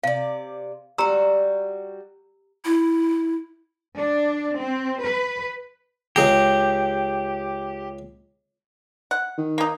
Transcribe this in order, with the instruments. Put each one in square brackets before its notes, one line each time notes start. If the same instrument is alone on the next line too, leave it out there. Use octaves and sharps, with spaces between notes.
[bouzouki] C3 D5 [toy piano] F5
[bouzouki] G3 F#4 [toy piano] G4 A#5 E6
[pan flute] E4
[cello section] D4
C4
B4
[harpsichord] C#2 G#4 A#5 [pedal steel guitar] G4
[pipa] F#5
[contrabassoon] D#3
[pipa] A#3 D#4